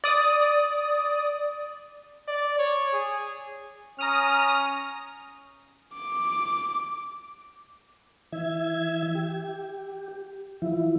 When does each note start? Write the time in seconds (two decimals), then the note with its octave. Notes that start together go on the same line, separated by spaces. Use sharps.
0.04 D5 D#6
2.28 D5
2.59 C#5
2.93 G#4
3.99 C#4 A#5 D#6 F6
5.94 D6
8.32 E3 E5 G#6
9.15 G4
10.62 E3 F3 E4